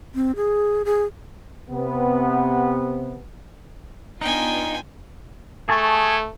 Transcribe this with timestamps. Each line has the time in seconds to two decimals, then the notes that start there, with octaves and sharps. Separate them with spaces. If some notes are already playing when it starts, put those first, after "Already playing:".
0.15 C4
0.36 G#4
0.85 G#4
1.71 C3 B3
4.21 B3 D4 D#4 F4 G5 G#5
5.69 A3 G#4 A5 C#6